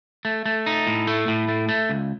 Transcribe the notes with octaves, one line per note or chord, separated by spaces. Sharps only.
A3
A3
D#4
A2
A3
A2
A3
A3
C#2